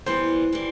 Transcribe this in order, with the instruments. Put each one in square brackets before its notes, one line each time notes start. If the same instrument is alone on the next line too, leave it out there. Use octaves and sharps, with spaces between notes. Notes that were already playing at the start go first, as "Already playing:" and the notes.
[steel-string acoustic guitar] E3 G3 B3 [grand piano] C5
[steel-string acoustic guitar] E3 G3